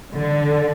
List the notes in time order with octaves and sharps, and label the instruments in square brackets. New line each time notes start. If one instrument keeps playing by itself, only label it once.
[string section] D3